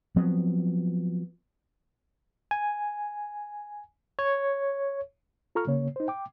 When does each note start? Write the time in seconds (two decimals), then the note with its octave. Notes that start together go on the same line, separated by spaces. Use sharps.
0.16 F3 F#3 B3 C4
2.51 G#5
4.19 C#5
5.55 F4 A4 A#5 C#6 F6
5.67 C#3 A#3 C#5
5.96 D#4 C5
6.08 G5 D6